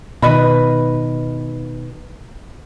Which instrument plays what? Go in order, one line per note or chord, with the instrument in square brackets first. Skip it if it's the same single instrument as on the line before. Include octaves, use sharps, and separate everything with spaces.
[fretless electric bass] B2 D#3 [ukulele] B4 D#5 B5